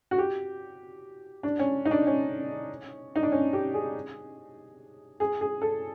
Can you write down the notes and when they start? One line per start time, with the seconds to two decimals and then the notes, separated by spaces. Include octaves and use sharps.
0.11 F#4
0.18 G4
1.43 D4
1.59 C#4
1.85 D#4
1.91 D4
2.07 C#4
3.16 D#4
3.23 D4
3.32 C#4
3.53 G4
3.74 G#4
5.20 G#4
5.41 G#4
5.62 A4